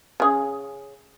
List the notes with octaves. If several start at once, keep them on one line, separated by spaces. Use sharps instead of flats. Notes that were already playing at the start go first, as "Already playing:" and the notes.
C#3 G#4